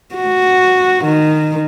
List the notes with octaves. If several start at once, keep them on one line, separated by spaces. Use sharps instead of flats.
F#4
D#3